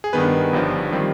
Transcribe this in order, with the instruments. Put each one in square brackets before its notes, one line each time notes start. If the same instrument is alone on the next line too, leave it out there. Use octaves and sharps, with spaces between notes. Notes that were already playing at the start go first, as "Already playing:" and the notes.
[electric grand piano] G#4
G2 D#3 B3 B4
G1 G2 F3
D#3 G3 C4